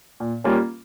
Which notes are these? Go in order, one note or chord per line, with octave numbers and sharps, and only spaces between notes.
A#2
G3 A#3 C#4 F4